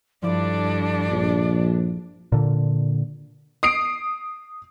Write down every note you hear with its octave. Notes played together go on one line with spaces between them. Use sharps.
G2 F3 D4 E4 A4 D5
A#1
A#2 D3
D#6 C7 D7